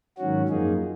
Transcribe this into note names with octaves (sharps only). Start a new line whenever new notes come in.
G#2 D#3 F#3 C#4 F#4
F#2 F3 A#3 D#4 G#4